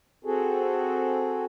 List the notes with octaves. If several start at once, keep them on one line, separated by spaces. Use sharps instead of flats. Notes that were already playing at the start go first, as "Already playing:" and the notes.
C4 F#4 G#4 A4